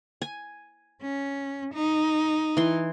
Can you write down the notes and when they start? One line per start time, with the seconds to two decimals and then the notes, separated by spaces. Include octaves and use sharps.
0.22 G#5
1.02 C#4
1.74 D#4
2.57 E3 C6